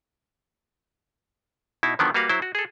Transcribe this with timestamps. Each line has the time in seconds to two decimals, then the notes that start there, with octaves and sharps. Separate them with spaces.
1.83 B2 D#4 E4
1.99 D3 D#3 F3 F#3 B3 D4
2.14 G3 A#3 F#4 B4 F5
2.29 F#3 E4 C5
2.42 F#4
2.55 G#4 A4